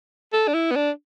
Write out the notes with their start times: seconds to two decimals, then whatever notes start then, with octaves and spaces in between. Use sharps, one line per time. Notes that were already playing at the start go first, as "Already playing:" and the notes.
0.33 A4
0.48 D4
0.54 E4
0.71 B3
0.76 D4